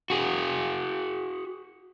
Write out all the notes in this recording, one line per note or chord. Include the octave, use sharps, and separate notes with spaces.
F#4 G#4